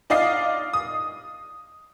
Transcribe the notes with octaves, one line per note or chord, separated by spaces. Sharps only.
D#4 D5 D#5 F5 C7
D#6